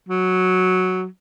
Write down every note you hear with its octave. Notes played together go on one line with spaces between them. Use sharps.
F#3